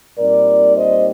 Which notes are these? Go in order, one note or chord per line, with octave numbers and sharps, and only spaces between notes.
A#2 G3 C4 D#4 A#4 D5
C5 D#5